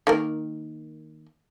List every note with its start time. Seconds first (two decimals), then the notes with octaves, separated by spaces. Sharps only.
0.07 D#3 A#3 A#4